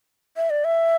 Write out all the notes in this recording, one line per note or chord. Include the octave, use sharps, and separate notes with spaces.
E5
D5
E5